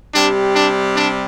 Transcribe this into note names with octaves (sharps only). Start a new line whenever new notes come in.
C3 G3 D4
D4
D4